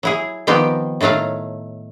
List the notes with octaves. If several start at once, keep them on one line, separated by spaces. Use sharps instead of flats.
F#3 E4 G#4
D#3 F3 B3 C4 G4
A2 D#3 F#3 A3 F5